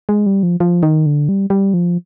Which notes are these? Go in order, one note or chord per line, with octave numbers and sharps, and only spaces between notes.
G#3
G3
F3
F3
D#3
D3
G3
G3
F3